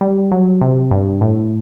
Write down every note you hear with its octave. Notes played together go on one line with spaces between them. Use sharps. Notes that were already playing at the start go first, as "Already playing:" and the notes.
G3
F#3
C3
G2
A2